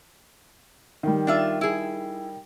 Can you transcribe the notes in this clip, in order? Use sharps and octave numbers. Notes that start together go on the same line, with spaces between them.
D#3 G3
D4 F4 E5
E4 G#4